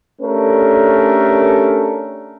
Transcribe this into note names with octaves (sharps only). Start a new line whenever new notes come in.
A3 C#4 D4 G4 A4 A#4